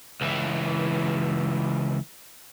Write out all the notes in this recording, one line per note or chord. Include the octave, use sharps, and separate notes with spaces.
C#2 E3